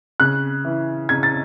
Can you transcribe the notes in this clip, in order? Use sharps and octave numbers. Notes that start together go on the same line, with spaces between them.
C#3 F#6
E3
C#3 G#6
A6